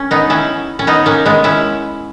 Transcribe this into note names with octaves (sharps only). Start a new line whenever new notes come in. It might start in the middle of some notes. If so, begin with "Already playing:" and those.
Already playing: C#4
B3 D#4
C#4 E4
C#4
B3 D#4
A#3 C#4
G#3 B3
C#4 E4